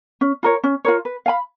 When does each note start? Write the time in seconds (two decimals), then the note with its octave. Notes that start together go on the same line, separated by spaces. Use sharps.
0.21 C#4
0.43 F4 A#4 C#5
0.64 C#4
0.85 F4 A#4 C#5
1.05 B4
1.26 F5 G#5 B5